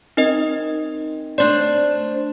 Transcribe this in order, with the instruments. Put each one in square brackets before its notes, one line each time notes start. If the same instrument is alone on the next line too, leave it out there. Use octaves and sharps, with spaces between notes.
[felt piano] C4 [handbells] D#4 A#4 D#5
[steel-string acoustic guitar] A3 D4 C5 [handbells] D5